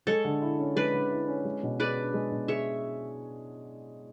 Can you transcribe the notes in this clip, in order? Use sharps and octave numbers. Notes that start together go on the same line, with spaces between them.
G#3 A4 C#5
D3
E4
C#4
G#3 B4 D5
D3
E4
C#4
G#3
B2
G#4 B4 D5
D4
G#3
B2
G#4 C#5 E5